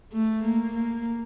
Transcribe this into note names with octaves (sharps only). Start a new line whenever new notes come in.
A3
A#3
A#3